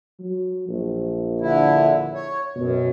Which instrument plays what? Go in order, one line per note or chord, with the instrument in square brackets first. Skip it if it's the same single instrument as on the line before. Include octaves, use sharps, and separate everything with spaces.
[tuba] F#3
A#1
[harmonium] D3 E4
C#5
[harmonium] F#2 [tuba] B2